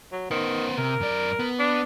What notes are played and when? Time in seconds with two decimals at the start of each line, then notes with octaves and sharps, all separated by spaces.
0.12 F#3
0.31 D#3 B3 C5
0.78 C3 A#4
1.00 F#2 D5
1.39 B3
1.59 D4